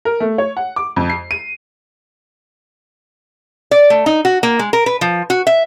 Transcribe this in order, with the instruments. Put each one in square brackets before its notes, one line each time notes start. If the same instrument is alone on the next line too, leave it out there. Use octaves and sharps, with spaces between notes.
[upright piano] A#4
A3
C#5
F#5
D6
F2
C7
D#7
[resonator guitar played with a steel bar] D5
A3
D#4
F#4
A#3
G#3
A#4
B4
F3
F#4
E5